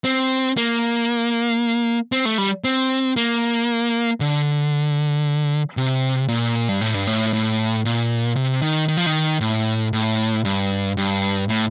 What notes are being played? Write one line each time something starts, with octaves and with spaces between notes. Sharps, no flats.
C4
A#3
C4
A3
G3
C4
A#3
D3
C3
A#2
G2
A2
G2
A2
A2
A#2
C3
D#3
D#3
F3
D#3
A2
A2
G2
G2
A2